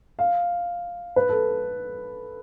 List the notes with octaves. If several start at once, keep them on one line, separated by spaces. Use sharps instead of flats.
F5
B4
A4